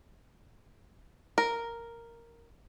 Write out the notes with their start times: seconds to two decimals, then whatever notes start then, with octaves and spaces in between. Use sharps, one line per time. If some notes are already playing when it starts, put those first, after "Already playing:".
1.38 A#4